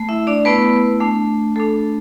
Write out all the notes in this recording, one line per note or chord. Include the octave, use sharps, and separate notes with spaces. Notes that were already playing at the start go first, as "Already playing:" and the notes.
Already playing: A3
E4 E5
D4 D5
A3 B3 E4 B4
A3 D4
A3 D4 A4